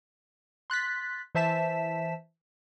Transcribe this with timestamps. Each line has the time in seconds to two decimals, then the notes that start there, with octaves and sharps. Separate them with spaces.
0.70 C6 F#6 A6 B6
1.35 E3 C5 E5 A5 B6 E7